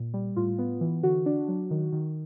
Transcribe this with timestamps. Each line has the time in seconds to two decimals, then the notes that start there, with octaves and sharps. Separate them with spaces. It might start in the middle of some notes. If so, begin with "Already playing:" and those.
Already playing: A#2
0.14 G3
0.36 A2 F4
0.58 B3
0.81 E3
1.03 D3 F#4
1.26 D4
1.48 F#3
1.71 D#3
1.93 D#3